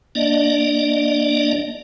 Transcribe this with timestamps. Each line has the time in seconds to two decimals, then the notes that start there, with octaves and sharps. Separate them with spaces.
0.15 A#3 D4 D5 D#5